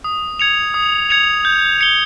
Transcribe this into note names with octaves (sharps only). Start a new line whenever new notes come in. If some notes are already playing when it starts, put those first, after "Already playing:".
D#6
G#6 C#7 F7
D#6
G#6 C#7 F7
G6
C#7 G7